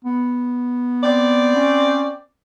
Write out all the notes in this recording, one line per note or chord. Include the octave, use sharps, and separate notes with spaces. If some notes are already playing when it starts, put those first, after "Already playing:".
B3
C4 D5
C#4